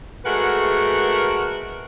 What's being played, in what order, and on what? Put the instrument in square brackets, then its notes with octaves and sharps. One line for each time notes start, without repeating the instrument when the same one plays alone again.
[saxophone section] G#3 A3 F#4 A#4 B4 F#5